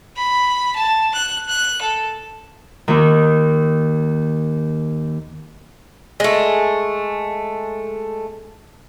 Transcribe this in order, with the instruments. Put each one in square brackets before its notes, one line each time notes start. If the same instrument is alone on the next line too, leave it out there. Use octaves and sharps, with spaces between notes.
[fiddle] B5
A5
F#6
F#6
A4
[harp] D#2 D#3
[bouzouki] G#3 A3